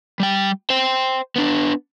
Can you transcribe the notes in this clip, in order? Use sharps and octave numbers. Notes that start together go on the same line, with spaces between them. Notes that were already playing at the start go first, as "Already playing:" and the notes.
G3 G5
C5 G5
B3 D4